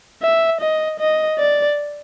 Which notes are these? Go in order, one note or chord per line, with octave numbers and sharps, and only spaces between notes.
E5
D#5
D#5
D5